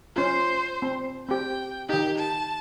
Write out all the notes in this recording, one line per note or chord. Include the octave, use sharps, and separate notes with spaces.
C#4 F4 C5
C4
C4 G4 G5
D#3 D#4 G4
A5